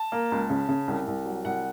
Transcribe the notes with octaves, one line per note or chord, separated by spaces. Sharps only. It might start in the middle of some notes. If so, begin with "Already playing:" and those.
Already playing: A5
A#3
C#2
C#3
C#3
C2
C2
F#3
C2 F#5